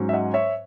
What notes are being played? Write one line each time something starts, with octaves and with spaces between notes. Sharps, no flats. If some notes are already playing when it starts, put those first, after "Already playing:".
Already playing: G#2 F#3 C#4
E5
D#5 F#5
C#5 E5